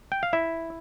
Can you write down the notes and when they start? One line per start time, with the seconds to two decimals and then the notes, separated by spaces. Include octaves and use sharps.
0.12 G5
0.23 F5
0.33 E4 E5